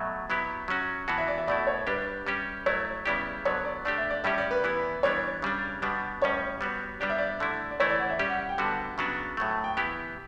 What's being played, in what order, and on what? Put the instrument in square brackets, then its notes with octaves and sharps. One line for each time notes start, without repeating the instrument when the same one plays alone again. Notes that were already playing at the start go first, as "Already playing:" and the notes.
Already playing: [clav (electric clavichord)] B2 F#3 A3 [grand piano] E5
[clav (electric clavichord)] F#3 B3 E4 G4 [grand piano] B5
[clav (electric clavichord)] F#3 C#4 F#4
[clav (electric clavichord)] E3 B3 F#4 [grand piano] A5
[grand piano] E5
D5
E5
[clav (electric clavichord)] B2 A3 E4 [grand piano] D5
[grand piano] C#5
[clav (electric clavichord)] G3 D4 G4 [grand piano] B4
[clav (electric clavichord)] G3 C#4 G4
[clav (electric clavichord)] F#3 A3 E4 [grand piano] C#5
[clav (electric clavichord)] C#3 G3 B3 E4 G4 [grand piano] D5
[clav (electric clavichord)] D3 F#3 B3 [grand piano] C#5
[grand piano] D5
[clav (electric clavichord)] D3 A3 D4 G4 [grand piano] D5
[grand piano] E5
D5
[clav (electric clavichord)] A2 G3 C#4 G4 [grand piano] E5
[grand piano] D5
B4
[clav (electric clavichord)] E3 B3 E4
[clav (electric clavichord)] E3 G3 B3 D4 [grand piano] C#5
[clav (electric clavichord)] C#3 G3 D4
B2 G3 B3 D4
[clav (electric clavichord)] A2 G3 C#4 [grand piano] C#5
[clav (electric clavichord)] G3 B3 F#4
[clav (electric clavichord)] G3 B3 D4 G4 [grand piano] D5
[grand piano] E5
D5
[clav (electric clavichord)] D3 A3 E4
[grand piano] D5
[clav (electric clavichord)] E3 A3 E4 [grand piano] C#5
[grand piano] D5
F#5
E5
[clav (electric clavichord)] G3 C#4 G4 [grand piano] D5
[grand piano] F#5
F#5
G5
[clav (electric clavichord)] D3 G3 B3 F#4 [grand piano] A5
[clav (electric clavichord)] C#3 F#3 B3 D4 F#4
[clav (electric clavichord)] A2 F#3 A3 [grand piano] C#6
[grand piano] A5
G5
[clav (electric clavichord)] E3 B3 E4 G4